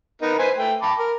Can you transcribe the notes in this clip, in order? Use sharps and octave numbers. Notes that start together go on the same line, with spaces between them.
B3 D#4 A#4
B4 C5 G#5
A3 G5
A5 B5 D6
A#4